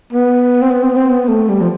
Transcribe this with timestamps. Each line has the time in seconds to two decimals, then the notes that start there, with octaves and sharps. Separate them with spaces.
0.13 B3
0.62 C4
0.71 B3
0.83 C4
0.92 B3
0.96 C4
1.10 B3
1.28 A3
1.49 G3
1.61 F3